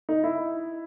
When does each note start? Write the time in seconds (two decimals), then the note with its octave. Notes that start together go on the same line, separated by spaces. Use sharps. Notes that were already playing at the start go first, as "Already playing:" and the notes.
0.09 D#4
0.24 E4